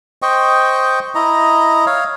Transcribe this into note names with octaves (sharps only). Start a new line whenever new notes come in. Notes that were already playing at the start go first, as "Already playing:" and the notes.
C5 D#5 G5 C#6
E4 D#5 A#5
C#5 F5